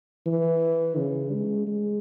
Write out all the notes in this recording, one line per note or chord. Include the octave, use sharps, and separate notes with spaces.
E3
C#3
G#3
G#3